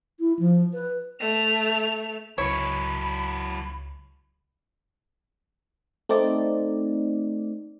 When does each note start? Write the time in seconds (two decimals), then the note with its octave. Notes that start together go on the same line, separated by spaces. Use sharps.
0.20 E4
0.39 F3
0.74 B4
1.19 A3 F7
2.38 C#2 F#3 E4 C#5 B5
6.09 A3 C4 D#4 D5